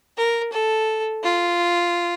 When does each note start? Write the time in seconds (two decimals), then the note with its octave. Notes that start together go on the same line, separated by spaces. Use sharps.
0.17 A#4
0.53 A4
1.24 F4